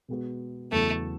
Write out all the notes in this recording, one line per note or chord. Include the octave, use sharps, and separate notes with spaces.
B2 G#3 B3 F#4
E2 C#3 F#3 A3 B3 E4